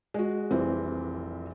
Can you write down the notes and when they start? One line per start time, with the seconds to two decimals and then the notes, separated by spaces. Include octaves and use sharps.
0.14 G#3 F#4
0.51 F1 A#1 E3 G3 C4